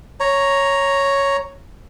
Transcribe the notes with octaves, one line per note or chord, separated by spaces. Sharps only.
C#5 A#5